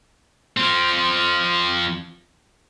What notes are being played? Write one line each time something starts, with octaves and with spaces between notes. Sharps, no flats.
F3 C4